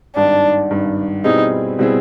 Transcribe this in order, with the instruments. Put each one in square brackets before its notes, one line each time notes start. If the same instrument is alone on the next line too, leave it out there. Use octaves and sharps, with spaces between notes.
[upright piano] G#1 G2 D#3 [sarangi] D4
[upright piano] G#1 G2 D#3
[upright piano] B2 G3 C4 E4 G#4 [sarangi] D#4
[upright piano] B2 G3 C4 E4 G#4